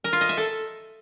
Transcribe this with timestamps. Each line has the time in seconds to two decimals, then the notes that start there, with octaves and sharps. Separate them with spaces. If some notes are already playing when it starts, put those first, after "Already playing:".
0.04 A#4
0.13 F4
0.21 D#5
0.29 E5
0.37 A4